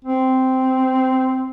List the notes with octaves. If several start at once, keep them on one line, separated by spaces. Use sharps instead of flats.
C4